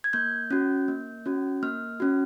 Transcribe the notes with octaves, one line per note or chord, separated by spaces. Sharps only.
G#6
A#3 G6
C#4 F#4
A#3
C#4 F#4
A#3 F6
C#4 F#4